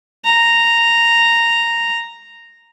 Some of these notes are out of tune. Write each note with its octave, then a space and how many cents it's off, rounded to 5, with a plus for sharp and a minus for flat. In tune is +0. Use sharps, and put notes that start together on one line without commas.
A#5 -5